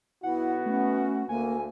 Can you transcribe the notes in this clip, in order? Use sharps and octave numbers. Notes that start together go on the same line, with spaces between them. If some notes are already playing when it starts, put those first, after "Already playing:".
B1 B3 E4 F#4 F#5
A3 C#4
D2 A#3 G#5